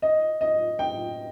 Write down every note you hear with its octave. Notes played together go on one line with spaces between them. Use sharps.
D#5
D#5
G5